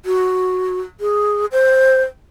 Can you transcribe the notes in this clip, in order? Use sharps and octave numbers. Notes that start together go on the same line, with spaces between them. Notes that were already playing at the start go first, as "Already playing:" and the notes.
F#4
G#4
C5